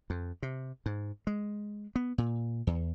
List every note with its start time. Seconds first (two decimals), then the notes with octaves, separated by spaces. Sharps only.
0.10 F2
0.42 C3
0.86 G#2
1.27 G#3
1.96 B3
2.18 A#2
2.67 E2